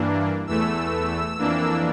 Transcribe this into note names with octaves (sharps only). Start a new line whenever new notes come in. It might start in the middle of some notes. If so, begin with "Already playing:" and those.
Already playing: G2 E3 A#3 D4
E2 E3 A3 E6
F2 E3 A#3 D4